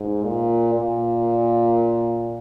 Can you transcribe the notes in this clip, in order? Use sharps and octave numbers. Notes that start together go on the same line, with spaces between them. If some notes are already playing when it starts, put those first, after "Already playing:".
Already playing: G#2
A#2
A#2